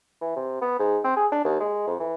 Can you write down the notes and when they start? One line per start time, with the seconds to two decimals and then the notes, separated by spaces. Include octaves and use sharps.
0.21 E3
0.36 C3
0.61 B3
0.79 G#2
1.04 C4
1.16 G#4
1.32 D4
1.45 D#2
1.60 G#3
1.87 F2
2.00 E3